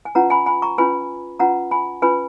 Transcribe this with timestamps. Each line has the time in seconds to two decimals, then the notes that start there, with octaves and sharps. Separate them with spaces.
0.05 G#5
0.15 C#4 F4 B4 F#5 A#5
0.30 G#5 B5
0.46 G#5 B5
0.62 A#5 C#6
0.78 C#4 F4 B4 G#5 B5
1.39 C#4 F4 B4 F#5 A#5
1.71 G#5 B5
2.02 C#4 F4 B4 G#5 B5